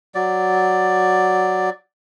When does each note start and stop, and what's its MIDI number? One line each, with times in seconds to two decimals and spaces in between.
0.15 1.70 54
0.15 1.70 74